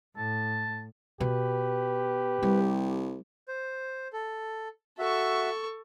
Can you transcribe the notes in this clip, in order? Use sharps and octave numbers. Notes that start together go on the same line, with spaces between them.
A2 A5
B2 G4 B4
C2 G3
C5
A4
F#4 A4 E5 C#6